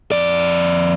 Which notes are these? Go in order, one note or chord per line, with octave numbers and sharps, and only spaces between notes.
F2 D5